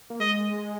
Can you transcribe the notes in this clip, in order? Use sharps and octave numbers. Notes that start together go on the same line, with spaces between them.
A#3
G#3 D#5